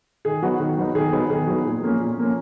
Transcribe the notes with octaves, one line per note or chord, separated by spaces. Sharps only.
D#3 G#4
F#3 B3 D#4 F#4
D#3
F#3 B3 D#4
D#3 G#4
F#3 B3 D#4
D#3 G#4
F#3 B3 D#4
A#2
F3 A#3 C#4
A#2
F3 A#3 C#4